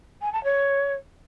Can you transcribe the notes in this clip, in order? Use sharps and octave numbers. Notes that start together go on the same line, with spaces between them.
G#5
A5
C#5